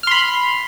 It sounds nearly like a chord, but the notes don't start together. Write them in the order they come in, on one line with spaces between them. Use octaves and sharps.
F6 C6 B5